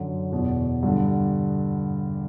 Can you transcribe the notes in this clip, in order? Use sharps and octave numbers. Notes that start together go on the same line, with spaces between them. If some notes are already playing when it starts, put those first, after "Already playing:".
Already playing: F#2 D3
E2 B2
G2 D3